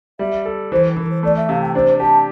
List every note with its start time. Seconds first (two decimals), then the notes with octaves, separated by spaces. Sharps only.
0.19 G3 E5
0.45 A4
0.71 E3 C5
0.97 E3 A#4
1.10 C5
1.23 A3 D5
1.35 E5
1.48 C3 F5
1.61 G5
1.74 D4 C5
2.00 G4 A5